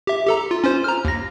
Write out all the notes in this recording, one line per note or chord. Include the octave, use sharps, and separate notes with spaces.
G4 E5
G4 A4 A#5
F4
C#4 F4 C5
A#5 F6
D#2 A#6